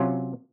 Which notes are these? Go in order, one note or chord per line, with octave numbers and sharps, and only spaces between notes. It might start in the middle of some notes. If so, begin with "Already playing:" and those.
Already playing: C3 F#3 C#4 F4